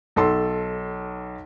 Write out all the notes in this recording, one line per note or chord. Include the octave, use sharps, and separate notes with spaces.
B1 A4 C6